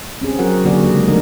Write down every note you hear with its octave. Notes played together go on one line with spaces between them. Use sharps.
C4 C#4 G#4
F#3 F#4 A#4 F#5
D3 F#3 A#3 F#4 G#4 D5
C#3 G#3 G4
G#3
F3 A3 C4 D4 D#4 A#4